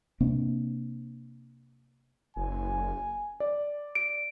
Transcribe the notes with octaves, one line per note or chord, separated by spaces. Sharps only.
C3 A#3 C4 D4
F#1 G#5
D5
D7